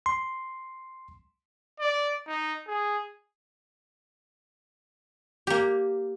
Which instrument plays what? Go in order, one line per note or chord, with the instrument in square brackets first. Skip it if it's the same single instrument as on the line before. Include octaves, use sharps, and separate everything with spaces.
[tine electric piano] C6
[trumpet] D5
D#4
G#4
[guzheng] A#3 G4